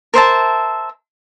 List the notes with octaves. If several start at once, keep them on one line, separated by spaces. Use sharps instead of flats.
A#4 C5 E5 A5